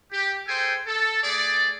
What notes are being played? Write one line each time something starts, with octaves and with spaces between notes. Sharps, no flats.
G4
G#4 A4 C5 G5 G#5
A4
A3 G#4 D5